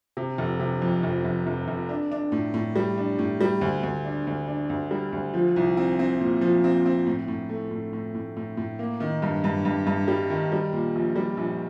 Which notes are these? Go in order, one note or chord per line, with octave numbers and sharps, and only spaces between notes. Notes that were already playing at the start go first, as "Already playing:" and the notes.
C3
F1
C3
F2
F1
F1
F1
F1
D4
D4
A2
A2
G3
D4
A2
G3
D2
D2
D4
D2
D4
D2
G3
D2
F3
C2
C4
C4
A#2
F3
C4
C4
A2
A2
A3
A2
A2
A2
A2
A2
A#3
D#3
G2
G2
G2
G2
G3
D#3
G3
A#2
A#1
G3
A#1